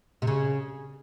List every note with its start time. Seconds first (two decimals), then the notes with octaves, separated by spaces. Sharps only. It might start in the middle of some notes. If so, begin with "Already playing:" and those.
0.22 C3
0.27 C#3